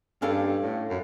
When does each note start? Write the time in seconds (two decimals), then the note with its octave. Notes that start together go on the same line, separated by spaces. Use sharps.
0.22 G2 C#4 A4 F5
0.62 A2
0.90 F#2